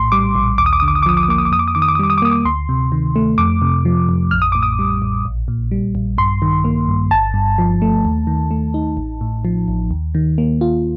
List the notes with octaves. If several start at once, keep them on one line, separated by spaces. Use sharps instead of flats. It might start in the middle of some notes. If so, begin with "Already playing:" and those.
Already playing: A#1 A2 C6
G3 D6
A#1
D#2 D6
D#6
D6
D3 D#6
D6
D#6
D6
F3 D#6
D6
D#6
A#3 D6
D#6
D6
F2 D#6
D6
D#6
D#3 D6
D#6
D6
D#6
G3 D6
D#6
D6
A#3 D#6
D6
D2 C6
C3
D#3
A3
F2 D6
C3
F3
F2
A1 F6
D#6
A2 D6
D#6
G3
A1
A#1
A#2
G3
A#1
G2 C6
D#3
A#3
G2
G1 A5
G2
F3
A3
D#2
D#3
A3
D#4
A1
A2
F3
A1
D#2
D#3
A#3
F4